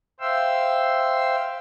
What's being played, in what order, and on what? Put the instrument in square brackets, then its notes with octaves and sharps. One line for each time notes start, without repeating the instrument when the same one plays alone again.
[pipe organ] C5 E5 F5 G5 C6 E6